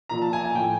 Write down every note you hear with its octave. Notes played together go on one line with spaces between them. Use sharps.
A#2 F3 A#5
A5
G#5
G#5
A2 F3 G5